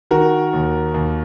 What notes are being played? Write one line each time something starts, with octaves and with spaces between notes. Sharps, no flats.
D#3 F#4 A#4
D#2
D#2